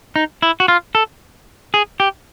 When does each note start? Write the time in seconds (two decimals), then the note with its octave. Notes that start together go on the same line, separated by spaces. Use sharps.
0.16 D#4
0.42 E4
0.60 F#4
0.68 F4
0.95 A4
1.74 G#4
2.00 G4